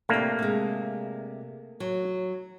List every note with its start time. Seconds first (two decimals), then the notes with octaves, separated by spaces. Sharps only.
0.09 C3 A3 A#3 D4 G4
0.39 C3 G#3
1.80 F#3